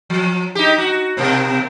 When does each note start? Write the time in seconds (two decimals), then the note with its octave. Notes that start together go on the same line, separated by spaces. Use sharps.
0.10 F3
0.55 D#4 G4
0.78 F#4
1.17 B2 A#3 C4